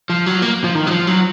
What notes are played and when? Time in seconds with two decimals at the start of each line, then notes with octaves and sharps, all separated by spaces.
0.10 F3
0.26 F#3
0.42 A#3
0.64 F3
0.75 D#3
0.87 F#3
0.91 F3
1.07 F#3